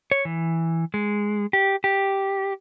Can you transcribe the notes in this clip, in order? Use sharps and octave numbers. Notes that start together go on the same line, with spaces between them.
C#5
E3
G#3
G4
G4